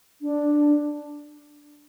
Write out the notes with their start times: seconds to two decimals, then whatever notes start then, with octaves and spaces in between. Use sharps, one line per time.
0.21 D4